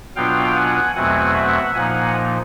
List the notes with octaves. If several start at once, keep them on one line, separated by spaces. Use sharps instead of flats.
B2 F#3 B3 D4 F4 F5 G5
F#5 G#5
E2 B2 F#3 A3 C4 F#5 G#5
E5 F#5
A#2 F3 A#3 D#4 F#5 G#5